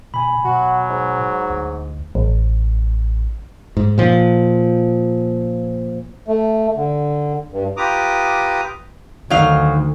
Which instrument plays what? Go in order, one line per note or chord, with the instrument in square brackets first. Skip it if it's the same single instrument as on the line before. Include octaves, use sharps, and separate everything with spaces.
[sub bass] B2 [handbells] G#5 B5
[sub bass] B2 [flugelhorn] F#3 [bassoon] F#4
[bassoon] G#2
[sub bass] D2
[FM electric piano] A1
[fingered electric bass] G#2
A#2 F3
[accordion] A3
D3
G2
F4 G4 B4 A#5 D6 D#6
[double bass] D2 [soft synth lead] D#3 [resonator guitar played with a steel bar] F#3 D#4 F5